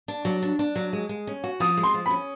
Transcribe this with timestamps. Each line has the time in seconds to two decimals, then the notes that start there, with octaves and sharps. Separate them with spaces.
0.08 D4
0.25 F#3
0.42 D4
0.59 D4
0.76 F#3
0.93 G#3
1.09 G#3
1.27 C#4
1.44 F#4
1.60 F3 D#6
1.77 G#3
1.83 C6
1.94 F3
2.06 B5
2.11 C#4